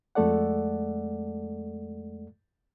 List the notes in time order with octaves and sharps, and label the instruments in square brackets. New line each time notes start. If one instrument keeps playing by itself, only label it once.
[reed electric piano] F2 G#3 A3 A4 D5 F#5